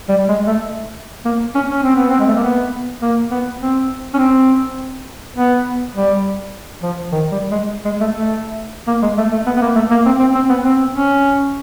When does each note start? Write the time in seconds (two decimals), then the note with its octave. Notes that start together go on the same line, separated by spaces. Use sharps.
0.09 G3
0.28 G#3
0.47 A3
1.25 A#3
1.55 C#4
1.70 C#4
1.83 C4
1.96 B3
2.09 C4
2.20 G#3
2.27 A3
2.36 A#3
2.43 B3
3.02 A#3
3.31 B3
3.60 C4
4.14 C#4
4.18 C4
5.36 B3
5.95 G3
6.82 F3
7.12 D#3
7.32 G3
7.51 G#3
7.85 G#3
8.00 A3
8.14 A3
8.87 A#3
9.02 G#3
9.18 A3
9.32 A3
9.46 B3
9.56 B3
9.62 A#3
9.75 A3
9.91 A#3
10.05 C4
10.20 C4
10.35 C4
10.49 B3
10.64 C4
10.92 C#4